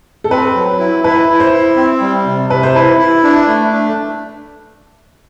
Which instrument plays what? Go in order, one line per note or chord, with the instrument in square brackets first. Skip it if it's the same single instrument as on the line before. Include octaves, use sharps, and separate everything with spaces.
[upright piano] A4
[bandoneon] C4 [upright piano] B4
[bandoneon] F#3
E4
[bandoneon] E4 [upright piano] B4
[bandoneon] E4
[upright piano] C5
[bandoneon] E4
C4
G3
C3
[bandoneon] C3 [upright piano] B4
[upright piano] C5
[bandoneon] E4 [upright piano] B4
[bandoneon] E4
D4
A3
D4